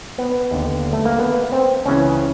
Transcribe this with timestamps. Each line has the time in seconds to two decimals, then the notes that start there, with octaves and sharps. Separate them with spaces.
0.18 B3
0.51 D#2 D3
0.93 A3
1.05 A#3
1.19 B3
1.52 C4
1.86 C#2 C#3 E3 C#4